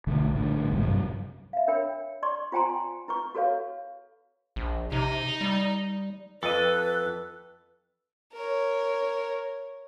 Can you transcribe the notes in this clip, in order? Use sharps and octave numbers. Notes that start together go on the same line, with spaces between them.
B1 D3 A3
A#1 A2 D3
F#1 B1 E2 G#2
G2 C3 F#3
E5 F5
D4 A#4 C#5 G5 B5
D5 C6 C#6
F4 C5 G5 G#5 A#5 C6
E4 B4 C#6
F#4 A4 B4 C#5 F5
A#1
C3 D#4
G3
F2 A4 B4 D#5
A#4 C#5